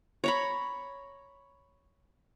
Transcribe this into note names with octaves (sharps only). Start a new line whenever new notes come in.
C#5 A#5 B5